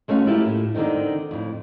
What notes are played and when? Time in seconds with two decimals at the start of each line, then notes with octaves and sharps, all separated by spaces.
0.08 G#3 A3 C#4 F#4 F5
0.26 A3 A#3 E4 F4 G4
0.46 A2
0.74 D3 D#3 A3 C4 D#4
1.31 F2 A2